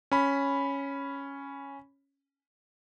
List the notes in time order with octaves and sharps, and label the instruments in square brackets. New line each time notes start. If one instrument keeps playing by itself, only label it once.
[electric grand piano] C#4 B5